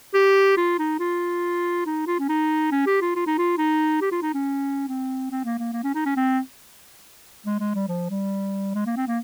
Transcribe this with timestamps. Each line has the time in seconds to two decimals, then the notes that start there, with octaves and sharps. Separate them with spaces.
0.14 G4
0.57 F4
0.79 D#4
0.99 F4
1.86 D#4
2.07 F4
2.19 C#4
2.28 D#4
2.71 C#4
2.86 G4
3.01 F4
3.16 F4
3.27 D#4
3.38 F4
3.58 D#4
4.01 G4
4.11 F4
4.22 D#4
4.34 C#4
4.88 C4
5.31 C4
5.45 A#3
5.59 A#3
5.73 A#3
5.84 C#4
5.94 D#4
6.05 C#4
6.16 C4
7.46 G#3
7.60 G#3
7.74 G3
7.88 F3
8.10 G3
8.74 G#3
8.86 A#3
8.96 C4
9.07 A#3